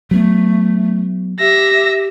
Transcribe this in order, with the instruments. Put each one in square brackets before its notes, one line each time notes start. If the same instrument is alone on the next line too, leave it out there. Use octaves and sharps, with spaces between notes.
[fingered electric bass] F#3 B3 [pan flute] A3
[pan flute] G4 [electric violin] E5 A#6